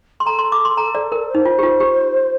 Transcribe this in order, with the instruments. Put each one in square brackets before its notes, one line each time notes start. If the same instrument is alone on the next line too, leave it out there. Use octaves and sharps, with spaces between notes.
[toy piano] C6
[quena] A4 [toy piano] A#5
[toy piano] C6
D6
C6
A#5
D5
A#4
[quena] C5
[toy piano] D#4
F4
G4
F4
G4